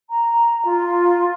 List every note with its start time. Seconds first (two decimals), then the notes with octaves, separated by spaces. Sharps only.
0.10 A#5
0.65 F4